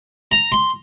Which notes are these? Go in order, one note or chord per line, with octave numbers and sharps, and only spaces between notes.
A#5
C6